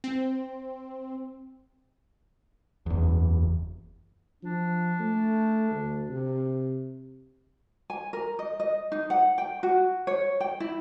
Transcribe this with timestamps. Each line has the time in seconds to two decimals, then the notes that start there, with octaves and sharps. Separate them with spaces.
0.04 C4
2.86 F#1 E2
4.43 F3 D4
4.99 A3
5.71 D2
6.08 C3
7.90 G#5
8.13 A#4
8.39 D#5
8.60 D#5
8.92 D#4
9.10 F#5
9.38 G5
9.63 F#4
10.07 C#5
10.41 G5
10.60 E4